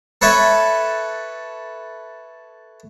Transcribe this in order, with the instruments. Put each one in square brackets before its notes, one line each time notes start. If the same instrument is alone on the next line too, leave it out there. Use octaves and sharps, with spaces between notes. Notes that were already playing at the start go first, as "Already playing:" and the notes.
[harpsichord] A4 B4 C#5 E5